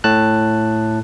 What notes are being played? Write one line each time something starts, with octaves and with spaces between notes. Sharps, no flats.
A2 A5 F#6